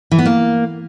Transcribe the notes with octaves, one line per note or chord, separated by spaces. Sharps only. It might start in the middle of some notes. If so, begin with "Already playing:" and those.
E3
B3
A#3